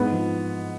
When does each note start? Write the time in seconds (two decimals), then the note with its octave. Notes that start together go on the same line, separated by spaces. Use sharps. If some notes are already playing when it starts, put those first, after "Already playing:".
Already playing: G#2 B3
0.12 F3